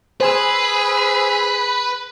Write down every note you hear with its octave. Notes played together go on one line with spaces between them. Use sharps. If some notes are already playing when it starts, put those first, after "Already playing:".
G#4 B4 C5 G#5 E6